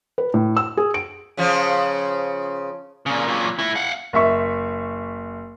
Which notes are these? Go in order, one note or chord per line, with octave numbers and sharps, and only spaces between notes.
B4
A2
E6
G#4
D7
C#3 F3 C#4
A#2 C#3
A#2 F#3
A3 E4
F5 F#5
F#1 E5 C#6